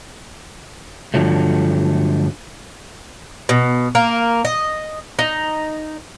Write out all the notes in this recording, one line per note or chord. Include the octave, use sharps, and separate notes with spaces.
G2 D3 F3 F#3 A3
B2
A#3
D#5
D#4